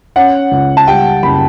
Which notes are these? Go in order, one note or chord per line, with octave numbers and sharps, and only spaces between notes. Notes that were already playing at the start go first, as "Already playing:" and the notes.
C#4 F#5
C#2
A5
G3 G5
F#1 B5